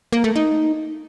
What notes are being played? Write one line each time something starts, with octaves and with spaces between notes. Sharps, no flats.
A#3
A3
D#4